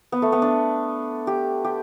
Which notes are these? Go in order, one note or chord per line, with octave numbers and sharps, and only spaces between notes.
B3
A3
B3
D4
G4
G4